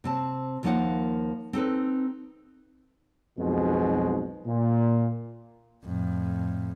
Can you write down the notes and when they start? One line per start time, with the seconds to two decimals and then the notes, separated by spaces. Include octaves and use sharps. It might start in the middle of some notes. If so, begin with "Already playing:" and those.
0.04 C3 C4 A5
0.63 D#2 F3 A#3 D#4 F4 F#5
1.53 C4 D#4 A4 B4
3.39 B1 F2 G#2 B2 G#3
4.46 A#2
5.85 F2 A2